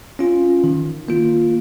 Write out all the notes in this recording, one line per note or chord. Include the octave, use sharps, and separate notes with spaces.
C#4 F4
D#3
A#3 F4